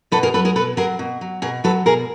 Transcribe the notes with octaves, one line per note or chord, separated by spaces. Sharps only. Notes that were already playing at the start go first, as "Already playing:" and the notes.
B2 A4 B4
G#4 A#4
F#3 A4 B4
G#4 A#4
B2 A4 B4
F#3 G#4 A#4
B2
F#3
B2 G#4 A#4
F#3 A4 B4
B2 G#4 A#4